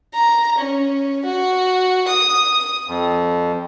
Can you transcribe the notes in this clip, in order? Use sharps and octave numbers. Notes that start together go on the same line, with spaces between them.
A#5
C#4
F#4
D#6
F2